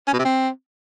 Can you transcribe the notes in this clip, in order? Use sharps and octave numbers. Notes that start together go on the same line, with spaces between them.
C#4
B2
C3
C4